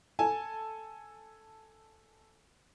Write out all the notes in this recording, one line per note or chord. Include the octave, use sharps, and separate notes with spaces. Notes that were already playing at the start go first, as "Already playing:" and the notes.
A4 G#5 A5